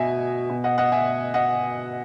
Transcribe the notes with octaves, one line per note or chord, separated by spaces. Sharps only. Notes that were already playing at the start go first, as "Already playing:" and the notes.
Already playing: B2 D#5 E5 G#5
B2
D#5 F#5
D#5 F#5
E5 G#5
D#5 F#5